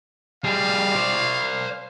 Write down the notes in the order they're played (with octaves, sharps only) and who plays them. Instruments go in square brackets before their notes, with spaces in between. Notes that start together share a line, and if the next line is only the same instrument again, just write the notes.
[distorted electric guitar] G3 G#4 [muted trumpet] F5
[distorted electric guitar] C5 D5